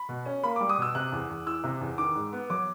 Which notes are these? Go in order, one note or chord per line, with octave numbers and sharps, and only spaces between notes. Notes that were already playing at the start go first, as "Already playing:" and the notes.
Already playing: B5
B2
C#4
A#3 B5
D6
G3
D#6
B2 E6
C3 F#6
E2
E2
E3 E6
C3
E2
D#3 D6
G#2
B3
F#3 D6